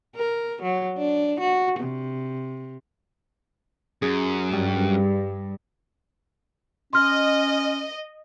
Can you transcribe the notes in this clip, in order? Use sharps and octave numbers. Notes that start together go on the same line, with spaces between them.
A#4
F#3
D4
F#4
C3
F#2 G#4
G2 G3
C#4 D#5 C6 F6